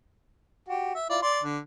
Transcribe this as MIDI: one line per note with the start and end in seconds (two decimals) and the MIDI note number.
0.68 0.94 66
0.68 0.94 67
0.95 1.08 76
1.09 1.19 64
1.09 1.19 65
1.09 1.19 74
1.22 1.41 74
1.22 1.41 84
1.43 1.58 50